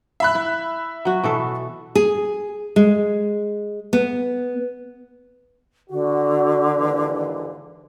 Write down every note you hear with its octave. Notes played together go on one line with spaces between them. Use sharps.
E5 B5 F#6
E4
F#3 F#4
B2 E3 A4
G#4
G#3
B3
D3 F#4
D#2 G#2 E3